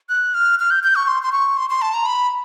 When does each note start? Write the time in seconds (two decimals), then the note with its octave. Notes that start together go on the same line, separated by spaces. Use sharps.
0.09 F#6
0.34 F6
0.59 F6
0.71 G6
0.83 G6
0.95 C#6
1.08 C6
1.23 C6
1.32 C#6
1.57 C6
1.70 C6
1.82 A5
1.94 A#5
2.06 B5